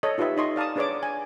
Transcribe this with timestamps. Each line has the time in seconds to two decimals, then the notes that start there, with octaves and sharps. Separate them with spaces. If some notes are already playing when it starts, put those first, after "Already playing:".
0.03 A4 C#5 D#5
0.18 D#4 F4 G4 B4 E5
0.37 D#4 D#5 C6 C#6
0.56 D5 F5 A5 A#5 D#6
0.76 D4 G#4 B4 C#5 D5 D6
1.03 G#5